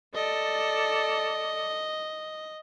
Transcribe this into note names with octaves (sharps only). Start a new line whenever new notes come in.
A4 D5 D#5